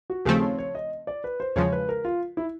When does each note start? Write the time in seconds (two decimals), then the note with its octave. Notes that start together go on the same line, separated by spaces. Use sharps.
0.10 F#4
0.25 D#2 C#3 F3 A3 C4 G#4
0.42 C#5
0.58 C#5
0.75 D#5
1.07 D5
1.24 B4
1.40 C5
1.56 E2 C#3 F3 G#3 C#5
1.72 B4
1.89 A#4
2.05 F4
2.37 E4